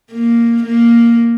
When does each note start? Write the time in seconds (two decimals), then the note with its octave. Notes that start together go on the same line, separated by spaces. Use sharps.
0.12 A#3
0.63 A#3